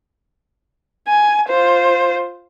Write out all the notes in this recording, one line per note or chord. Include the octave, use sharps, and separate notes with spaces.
G#5
F4 C5